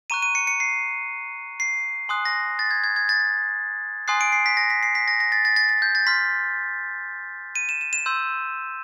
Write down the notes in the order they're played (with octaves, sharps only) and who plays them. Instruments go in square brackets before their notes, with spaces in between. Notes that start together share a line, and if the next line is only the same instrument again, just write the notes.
[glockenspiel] A#5 C#6 F#6 D#7
D#7
C#7
C#7
C7
C7
G#5 C6 D#6 F#6
A#6
A6
G#6
G#6
G#6
A6
G#5 C6 D#6 F#6 C7
D7
C7
B6
A#6
B6
C7
B6
A#6
A#6
A6
A6
A6
A6
G6
A6
C6 F6 B6
D#7
E7
E7
E7
C6 E6 G6